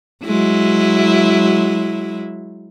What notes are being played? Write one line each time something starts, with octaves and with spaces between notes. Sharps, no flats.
F#3 G#3 E4